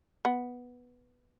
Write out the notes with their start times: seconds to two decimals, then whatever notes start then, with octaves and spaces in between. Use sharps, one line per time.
0.25 B3